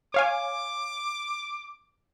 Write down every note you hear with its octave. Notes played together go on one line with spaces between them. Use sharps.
C#5 F5 G#5 D6